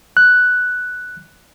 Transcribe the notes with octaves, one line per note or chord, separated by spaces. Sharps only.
F#6